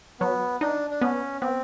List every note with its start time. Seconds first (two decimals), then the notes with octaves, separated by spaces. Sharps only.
0.20 F#3 B3
0.61 D4 D#4
0.90 D4
1.01 B3 C#4
1.41 B3 C4